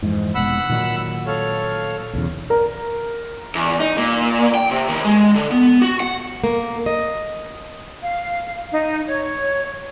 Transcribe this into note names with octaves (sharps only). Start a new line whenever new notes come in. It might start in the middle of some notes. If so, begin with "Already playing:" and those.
F2 G#2 E3
F1 B2 G#3 F#5 B5 E6
A#2 D#3 F#3
A4 C#5 F5
B1 E2 C#3
A#4
E2
D#4
A#2
G5
C3
D#2
G#3
D3
B3
F#4
F#5
A#3
D#5
F5
D#4
C#5